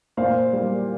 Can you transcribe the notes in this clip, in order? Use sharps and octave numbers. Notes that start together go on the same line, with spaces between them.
A#2 C5 F5
G3 A#3